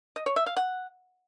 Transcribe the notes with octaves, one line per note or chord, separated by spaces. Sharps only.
D#5
C#5
E5
F5
F#5